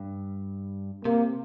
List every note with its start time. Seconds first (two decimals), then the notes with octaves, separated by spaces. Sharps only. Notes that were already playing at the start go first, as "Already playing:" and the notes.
Already playing: G2
1.05 C3 A#3